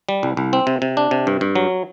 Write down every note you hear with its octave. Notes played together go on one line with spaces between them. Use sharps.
G3
C2
C2
C4
C3
C3
D4
C3
G2
G2
F#3